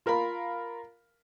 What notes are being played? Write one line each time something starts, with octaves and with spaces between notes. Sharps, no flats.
F4 A#4 F5 B5